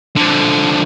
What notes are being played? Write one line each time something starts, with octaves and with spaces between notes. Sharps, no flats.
D3 F3